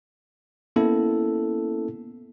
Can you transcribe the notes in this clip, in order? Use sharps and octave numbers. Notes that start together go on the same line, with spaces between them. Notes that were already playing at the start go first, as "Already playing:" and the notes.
A#3 B3 C#4 E4 A4